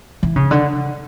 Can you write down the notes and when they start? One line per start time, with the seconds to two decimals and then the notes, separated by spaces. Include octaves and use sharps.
0.23 E3
0.36 C#3
0.51 D3